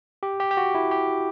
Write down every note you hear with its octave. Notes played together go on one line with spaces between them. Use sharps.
G4
G4
G4
F#4
E4
G4